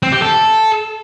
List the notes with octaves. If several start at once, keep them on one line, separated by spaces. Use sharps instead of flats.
C4
G4
A4